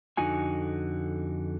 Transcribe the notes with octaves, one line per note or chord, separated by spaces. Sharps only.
F2 D3 D#4 F#4 G#5